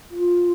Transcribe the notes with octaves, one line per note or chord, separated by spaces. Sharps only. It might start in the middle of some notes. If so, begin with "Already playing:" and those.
F4